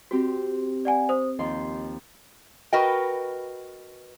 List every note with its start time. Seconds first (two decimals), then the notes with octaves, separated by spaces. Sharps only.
0.11 C4 F#4 G4 C5
0.85 D5 F#5 G#5
1.09 C5 D#6
1.39 D#2 F3 D#5 C6
2.73 F#4 A#4 B4 D#5 G5